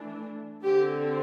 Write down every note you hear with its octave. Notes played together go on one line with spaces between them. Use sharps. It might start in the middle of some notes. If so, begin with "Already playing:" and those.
Already playing: E3 A3 D4
D3 C4 G4